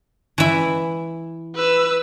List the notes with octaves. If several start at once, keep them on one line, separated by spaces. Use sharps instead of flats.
E3 E4
B4 E6